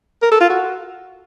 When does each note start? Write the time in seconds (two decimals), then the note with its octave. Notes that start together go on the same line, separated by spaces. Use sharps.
0.22 A#4
0.31 A4
0.40 F4
0.49 F#4